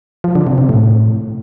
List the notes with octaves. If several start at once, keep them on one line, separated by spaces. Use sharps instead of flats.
F3
D3
C3
C3
A2